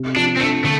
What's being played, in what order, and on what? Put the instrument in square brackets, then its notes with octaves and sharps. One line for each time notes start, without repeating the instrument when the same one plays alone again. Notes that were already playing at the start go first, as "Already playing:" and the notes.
Already playing: [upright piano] C3
[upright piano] F3 [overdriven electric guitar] D4
[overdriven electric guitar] C4
[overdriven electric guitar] A3 [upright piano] D4
[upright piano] D3 [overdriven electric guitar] A3